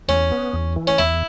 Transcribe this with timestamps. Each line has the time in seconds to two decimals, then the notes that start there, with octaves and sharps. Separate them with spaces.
0.08 E2 C#4
0.32 B3
0.53 E2
0.76 E3
0.87 C#4
0.98 E2 E4